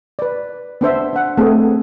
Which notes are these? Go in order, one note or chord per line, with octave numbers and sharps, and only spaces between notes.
B4 D5
B3 D4 C5 E5
D4 F#5
A3 B3 C4 G#4 A4